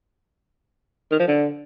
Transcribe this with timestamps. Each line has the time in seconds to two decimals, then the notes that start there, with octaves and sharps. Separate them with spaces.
1.11 D#3
1.19 F3
1.28 D3